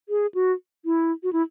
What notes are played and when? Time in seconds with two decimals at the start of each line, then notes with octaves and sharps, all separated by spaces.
0.09 G#4
0.35 F#4
0.85 E4
1.23 F#4
1.33 E4